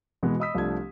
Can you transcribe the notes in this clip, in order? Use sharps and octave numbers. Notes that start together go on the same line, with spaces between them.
B2 E3 G#3 B3
D#5 B5 D#6 E6 B6
C2 F3 A3 D4 G#6